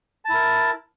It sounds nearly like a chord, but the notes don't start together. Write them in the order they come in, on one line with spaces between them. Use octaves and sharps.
A5 E4 A#4